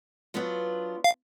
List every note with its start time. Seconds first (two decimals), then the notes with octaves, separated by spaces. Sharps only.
0.34 F#3 B3 D4 F4
1.04 F5